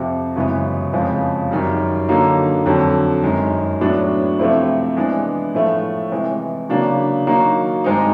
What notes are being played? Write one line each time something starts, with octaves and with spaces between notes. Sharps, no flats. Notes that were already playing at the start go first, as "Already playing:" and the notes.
Already playing: F2 C3 F3
F#2 C#3 E3 G#3 B3
F2 C#3 F3 G#3
F#2 D#3 G3
D3 F#3 A#3 D#4
F2 D3 F#3
F#2 D#3 G#3
A2 F#3 B3 D4
C3 F3 A3 C4 E4
E3 G#3 B3 D4
A2 F3 A3
C3 E3 G#3
C#3 F#3 A#3 D4 F#4
D#3 F#3 A#3 D#4 F#4
G2 D#3 G#3 C4 D#4